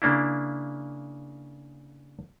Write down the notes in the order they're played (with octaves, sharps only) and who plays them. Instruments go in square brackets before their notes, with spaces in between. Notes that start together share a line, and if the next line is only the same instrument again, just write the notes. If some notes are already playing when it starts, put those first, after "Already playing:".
[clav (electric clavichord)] C#3 A#3 D4 E4